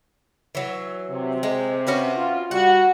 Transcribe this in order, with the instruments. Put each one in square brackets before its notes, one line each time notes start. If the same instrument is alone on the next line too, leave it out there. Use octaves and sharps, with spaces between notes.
[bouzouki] E3 F#3
[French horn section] C3
[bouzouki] G#3
C#4 F#4 B4
[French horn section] F4
[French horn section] G3 F#4 [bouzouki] F#5